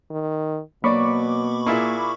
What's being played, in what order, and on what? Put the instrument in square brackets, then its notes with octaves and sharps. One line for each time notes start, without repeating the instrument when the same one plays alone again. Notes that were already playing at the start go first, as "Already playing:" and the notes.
[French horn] D#3
[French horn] B2 [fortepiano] F#3 D5 [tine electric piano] A#3 [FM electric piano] B5 C#6 D6
[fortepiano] A#2 E4 G#4